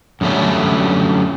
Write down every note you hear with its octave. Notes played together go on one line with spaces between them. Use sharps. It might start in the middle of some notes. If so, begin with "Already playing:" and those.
F#2 D3 G3 A3 C#4